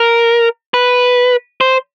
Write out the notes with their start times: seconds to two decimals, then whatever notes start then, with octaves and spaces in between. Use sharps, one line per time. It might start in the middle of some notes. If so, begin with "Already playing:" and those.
Already playing: A#4
0.74 B4
1.61 C5